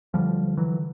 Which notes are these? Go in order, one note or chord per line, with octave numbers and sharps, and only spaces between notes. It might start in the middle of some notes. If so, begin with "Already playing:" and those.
D2 D3 F3 G3
E3 F#3